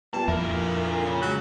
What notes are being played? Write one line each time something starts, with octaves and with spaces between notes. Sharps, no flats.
A#2 G3 B3 A5
F2 D3 A#3 E4 A#4
C#3
F#3 G#3 F#6